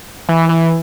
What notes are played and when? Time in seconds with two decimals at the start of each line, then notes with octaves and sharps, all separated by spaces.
0.29 E3
0.49 E3